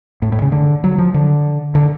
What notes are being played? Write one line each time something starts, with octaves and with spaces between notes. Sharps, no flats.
A2
A2
C#3
D3
F#3
F3
D3
D3